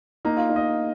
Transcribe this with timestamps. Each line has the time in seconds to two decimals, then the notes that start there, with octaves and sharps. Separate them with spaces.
0.25 A#3 D#4
0.37 F4
0.50 D#4
0.56 D#5